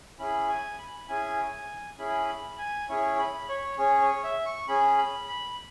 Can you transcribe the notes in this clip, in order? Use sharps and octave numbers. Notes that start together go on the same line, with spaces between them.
C#4 E4 G#4 B5
G#5
B5
C#4 E4 G#4 G#5
C#4 E4 G#4 B5
B5
G#5
C#4 E4 G#4 C#5
B5
C#5
C#4 G#4 C#5
C#5
E5
C#6
C#4 G#4 B5
B5
B5